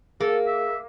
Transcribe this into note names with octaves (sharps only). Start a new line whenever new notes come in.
A#3 G#4 A4
E5